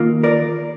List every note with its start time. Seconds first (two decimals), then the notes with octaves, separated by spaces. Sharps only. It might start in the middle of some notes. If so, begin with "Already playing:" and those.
Already playing: D#3 A#3 F4
0.23 A#4 D5